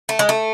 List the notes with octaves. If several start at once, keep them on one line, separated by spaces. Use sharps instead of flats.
A3
G#3
A3